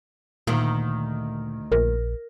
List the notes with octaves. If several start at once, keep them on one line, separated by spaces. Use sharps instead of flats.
D2 A#2 D#3
A#1 A#4